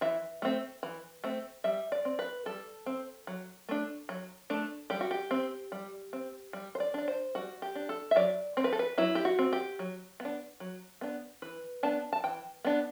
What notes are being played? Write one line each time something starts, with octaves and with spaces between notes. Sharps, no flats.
E3 E5
A3 C4
E3
A3 C4
G3 E5
D5
C4
B4
G3 A4
C4
F#3
A3 D4
F#3
A3 D4
G3 G4
F#4
G4
C4
G3
C4
G3
C5
D5
D4 D5
C5
G3 F#4
G4
D4
A4
E5
F#3 D5
C4 C5
B4
A4
B4
F#3 E4
G4
F#4
C4
G4
F#3
B3
D4
F#3
B3 D4
E3 B4
B3 D4 A5
A5
E3 G5
B3 D4